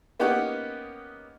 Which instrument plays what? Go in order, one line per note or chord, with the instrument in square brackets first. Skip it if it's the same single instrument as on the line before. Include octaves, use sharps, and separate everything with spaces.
[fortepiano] A#3 B3 C#4 D#4 G4 F#5